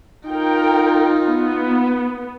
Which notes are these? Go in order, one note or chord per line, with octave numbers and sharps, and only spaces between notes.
D#4 F4 A#4 G5
B3